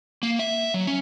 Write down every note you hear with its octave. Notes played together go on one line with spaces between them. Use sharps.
A#3
E5
F#3
C#4